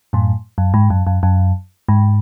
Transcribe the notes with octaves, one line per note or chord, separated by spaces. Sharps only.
F#2 A2
F#2
G#2
F#2
F#2
F#2
G#2